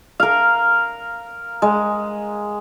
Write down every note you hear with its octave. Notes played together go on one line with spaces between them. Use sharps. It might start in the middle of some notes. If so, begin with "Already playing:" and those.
A#4 F5
G#3